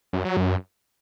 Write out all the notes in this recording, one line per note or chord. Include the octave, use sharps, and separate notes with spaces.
F#2
F#3
F#2